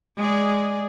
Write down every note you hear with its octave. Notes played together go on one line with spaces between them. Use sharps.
G#3 G#4 D5